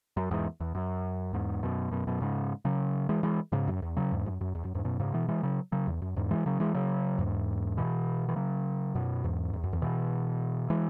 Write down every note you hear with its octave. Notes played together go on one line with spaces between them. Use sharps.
F#2
E2 G#2
E2
F#2
E2 G#2
F#2 B2
F#2 B2
F#2 B2
G#2 C#3
C#3 F#3
E3 G#3
E3 G#3
G#2 C#3
F#2
E2
C#3 F#3
E2 G#2
F#2
F#2
E2
F#2
E2 G#2
F#2 B2
G#2 C#3
B2 E3
E3 G#3
C#3 F#3
C#3 F#3
E2
F#2
E2 G#2
E3 G#3
C#3 F#3
E3 G#3
C#3 F#3
E2 G#2
B2 E3
E3
C#3 F#3
F#2 B2
E2 G#2
E2
F#2
E2
B2 E3
E3 G#3